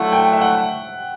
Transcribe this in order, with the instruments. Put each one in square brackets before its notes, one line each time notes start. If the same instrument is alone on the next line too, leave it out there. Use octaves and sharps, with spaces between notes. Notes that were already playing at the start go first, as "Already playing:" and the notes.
Already playing: [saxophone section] D3 F#3 A3 E4 [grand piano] F#5
[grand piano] G5
E5
F#5